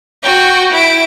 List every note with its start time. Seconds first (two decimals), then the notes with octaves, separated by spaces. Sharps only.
0.23 F#4 G5
0.72 E4 D7